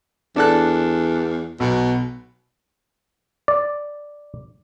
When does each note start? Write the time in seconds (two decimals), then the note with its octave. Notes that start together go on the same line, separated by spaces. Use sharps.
0.36 E2 D4 A4 F#6
1.60 B1 B2
3.48 D5